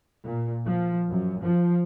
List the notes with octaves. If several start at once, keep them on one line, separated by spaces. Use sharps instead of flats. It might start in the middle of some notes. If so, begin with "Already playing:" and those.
A#2
F3
F#2
F3